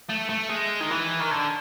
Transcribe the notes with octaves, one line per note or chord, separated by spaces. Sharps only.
A3
A3
G#3
D#3
E3
D#3
D3